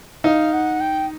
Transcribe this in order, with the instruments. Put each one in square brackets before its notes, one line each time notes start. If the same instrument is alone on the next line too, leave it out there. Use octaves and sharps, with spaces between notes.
[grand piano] D#4 [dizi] F5
[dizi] F#5
G5